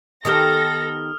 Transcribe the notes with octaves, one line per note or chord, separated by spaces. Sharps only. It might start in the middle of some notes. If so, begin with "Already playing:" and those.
D#3 B3 G4 A4 D#6 F6 A#6